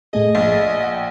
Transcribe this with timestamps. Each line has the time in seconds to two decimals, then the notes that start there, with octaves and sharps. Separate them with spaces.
0.13 A2 A3 G#4 D#5
0.35 A#1 A6
0.80 F#5
0.92 G5